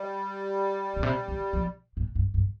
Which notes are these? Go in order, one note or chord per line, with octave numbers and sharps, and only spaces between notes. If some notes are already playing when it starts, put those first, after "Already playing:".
Already playing: G3
A#2
C3
D#3
F3
G#2
G2
G2